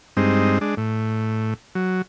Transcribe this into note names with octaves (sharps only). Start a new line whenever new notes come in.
G2 G#3 C4 D#4
G#3 D4
A2
F#3